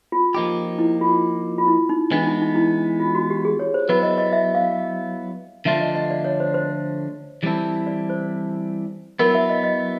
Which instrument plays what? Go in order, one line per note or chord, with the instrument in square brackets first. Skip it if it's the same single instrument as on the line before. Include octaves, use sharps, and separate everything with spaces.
[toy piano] F4
[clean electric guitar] F3 A#3 D#4 G4
[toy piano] E4
F4
F4
E4
D#4
[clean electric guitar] E3 G#3 B3 [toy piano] D4
[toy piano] D#4
D#4
E4
F4
F#4
G4
G#4
C#5
C5
[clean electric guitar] F#3 B3 E4 [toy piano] B4
[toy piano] D#5
D#5
E5
F5
[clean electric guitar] D3 F3 A3 D4 F4 [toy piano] E5
[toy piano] D#5
D#5
D5
C#5
C5
C5
[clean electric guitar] E3 G3 C4 E4 A4
[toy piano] D5
C5
[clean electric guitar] F#3 B3 E4 [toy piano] A#4
[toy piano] E5
D#5
D#5